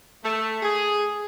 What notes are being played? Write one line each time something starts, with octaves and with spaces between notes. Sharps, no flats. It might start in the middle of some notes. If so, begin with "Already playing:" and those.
A3
G#4